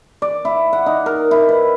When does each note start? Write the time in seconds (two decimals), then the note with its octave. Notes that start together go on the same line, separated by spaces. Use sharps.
0.22 D5
0.45 E4
0.73 F#5
0.86 D#4
1.06 A#4
1.31 E4
1.49 B4